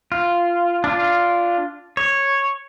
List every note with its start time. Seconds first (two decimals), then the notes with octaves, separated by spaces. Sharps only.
0.12 F4
0.84 D4 F4
1.97 C#5